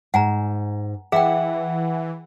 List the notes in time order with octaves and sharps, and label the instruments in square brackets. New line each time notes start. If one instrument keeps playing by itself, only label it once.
[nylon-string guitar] G#2 [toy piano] F#5 G#5 A#5
[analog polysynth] E3 [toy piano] G#4 G5 [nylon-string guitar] E5 [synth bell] F#5